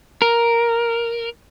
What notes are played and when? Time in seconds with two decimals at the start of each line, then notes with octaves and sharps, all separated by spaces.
0.22 A#4